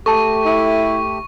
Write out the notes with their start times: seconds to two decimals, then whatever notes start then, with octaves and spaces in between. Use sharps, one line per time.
0.06 A3 G4 A4 A5 C#6
0.45 E4